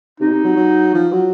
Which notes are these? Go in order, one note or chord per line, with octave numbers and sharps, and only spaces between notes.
C3 D#4
B2
C3
F#3
F#3
F3
F#3